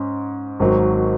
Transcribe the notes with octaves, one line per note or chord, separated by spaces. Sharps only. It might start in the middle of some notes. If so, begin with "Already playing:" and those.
Already playing: G#2 C#4
G#1 G#2 D#3 F#3